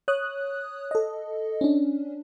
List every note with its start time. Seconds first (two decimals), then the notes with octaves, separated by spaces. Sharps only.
0.08 C#5 D#6 F#6
0.91 A4 D#5
1.61 C#4 D4